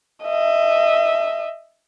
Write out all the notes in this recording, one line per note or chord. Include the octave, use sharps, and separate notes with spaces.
D#5 E5